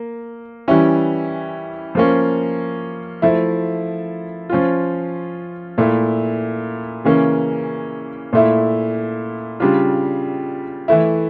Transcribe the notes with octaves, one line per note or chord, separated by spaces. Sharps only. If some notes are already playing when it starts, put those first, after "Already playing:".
Already playing: A#3
E3 G3 C#4 E4
F3 A#3 C#4
F3 A3 E4
F3 C#4 F4
A#2 A3 E4
C#3 E3 A#3 C#4
A#2 A3 E4
C#3 G3 D4 F4
E3 A3 E4